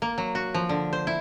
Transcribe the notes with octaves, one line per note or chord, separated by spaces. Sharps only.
A#3
F#3
F#4
F3
D3
C5
E4